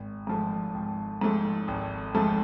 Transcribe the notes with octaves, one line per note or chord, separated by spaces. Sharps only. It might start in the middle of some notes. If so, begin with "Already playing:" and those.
Already playing: G#1
G#2 F3 A3
G#1
G#2 F3 A3
G#1
G#2 F3 A3